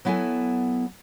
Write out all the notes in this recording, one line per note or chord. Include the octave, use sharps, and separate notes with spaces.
F#3 B3 E4 A4 G#5